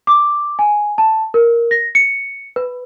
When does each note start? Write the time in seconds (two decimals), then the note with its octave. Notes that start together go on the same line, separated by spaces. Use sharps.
0.07 D6
0.59 G#5
0.98 A5
1.34 A#4
1.71 A#6
1.95 C#7
2.56 B4